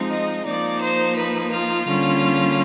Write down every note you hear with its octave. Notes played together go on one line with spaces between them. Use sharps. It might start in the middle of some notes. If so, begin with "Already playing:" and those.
Already playing: F3 G#3 C4 D#4
D#5
F3 A#3 D#4 D5
C5
B4
F4
D3 G3 A#3 C#4